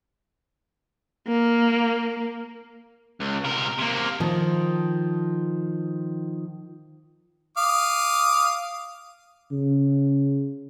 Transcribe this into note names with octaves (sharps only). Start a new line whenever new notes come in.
A#3
C#2
C3 A#4
C3 A#3
D#3 F3
F5 D6 D#6
C#3